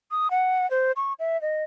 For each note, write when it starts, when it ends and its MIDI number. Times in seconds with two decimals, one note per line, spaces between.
0.11 0.30 87
0.31 0.69 78
0.71 0.92 72
0.96 1.13 85
1.19 1.40 76
1.42 1.64 75